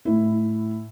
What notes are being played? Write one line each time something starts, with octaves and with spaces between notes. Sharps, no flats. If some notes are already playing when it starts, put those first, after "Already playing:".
A2 E4